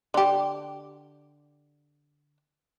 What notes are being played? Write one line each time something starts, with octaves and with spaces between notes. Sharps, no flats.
D3 G4